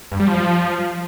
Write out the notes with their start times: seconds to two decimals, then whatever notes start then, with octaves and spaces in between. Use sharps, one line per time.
0.12 G2
0.20 G3
0.28 F3